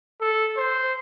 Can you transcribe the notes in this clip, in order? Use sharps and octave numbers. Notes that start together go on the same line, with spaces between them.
A4
C5